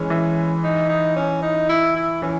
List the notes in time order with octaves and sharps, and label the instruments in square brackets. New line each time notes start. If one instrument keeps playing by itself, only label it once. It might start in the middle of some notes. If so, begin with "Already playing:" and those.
Already playing: [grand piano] E3 G#3 [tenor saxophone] C#4
[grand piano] E3
[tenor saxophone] D#4
D#4
C#4
D#4
E4
E4
[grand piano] E3 [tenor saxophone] C#4